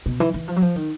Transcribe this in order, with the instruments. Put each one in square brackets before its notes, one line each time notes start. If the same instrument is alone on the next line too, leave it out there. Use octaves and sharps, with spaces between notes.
[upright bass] B2
E3
E3
F3
F#3
F3
D#3